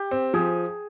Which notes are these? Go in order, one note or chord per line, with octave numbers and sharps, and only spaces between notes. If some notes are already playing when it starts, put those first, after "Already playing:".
Already playing: G4
C4
F3 G#4